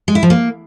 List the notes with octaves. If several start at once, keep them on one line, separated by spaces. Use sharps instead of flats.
G#3
E4
F3
A#3